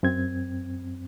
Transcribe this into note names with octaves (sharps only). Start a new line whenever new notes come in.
F#2 C4 G#6